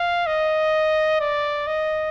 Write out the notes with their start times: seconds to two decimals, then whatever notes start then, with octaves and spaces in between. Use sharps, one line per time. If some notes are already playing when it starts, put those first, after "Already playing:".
Already playing: F5
0.26 D#5
1.20 D5
1.67 D#5